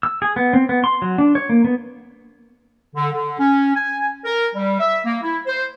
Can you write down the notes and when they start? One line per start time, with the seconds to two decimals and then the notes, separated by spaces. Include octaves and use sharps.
0.03 E6
0.22 G#4
0.36 B3
0.53 C4
0.69 B3
0.84 C6
1.02 F#3
1.18 D4
1.35 C#5
1.49 A#3
1.65 B3
2.95 D3
3.13 D3
3.39 C#4
3.75 G#5
4.25 A#4
4.55 G3
4.80 E5
5.05 A#3
5.23 E4
5.47 C5